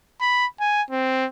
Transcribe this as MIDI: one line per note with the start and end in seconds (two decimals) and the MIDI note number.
0.21 0.46 83
0.60 0.82 80
0.90 1.26 60